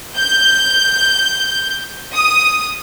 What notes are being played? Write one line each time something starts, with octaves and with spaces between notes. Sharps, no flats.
G6
D#6